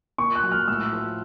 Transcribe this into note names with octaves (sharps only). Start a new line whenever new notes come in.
A#2 C#6
F#6
F#3
F6
A2 E6
F3